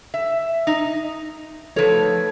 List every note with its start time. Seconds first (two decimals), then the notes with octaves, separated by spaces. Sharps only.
0.14 E5
0.67 D#4
1.76 F3 D#4 A4 B4 C#5